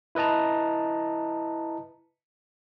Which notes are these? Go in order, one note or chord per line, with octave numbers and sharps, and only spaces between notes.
E4 B4 D#5 A5 A#5